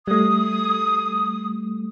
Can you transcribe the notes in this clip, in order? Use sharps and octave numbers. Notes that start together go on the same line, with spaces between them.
G3 A3 D#6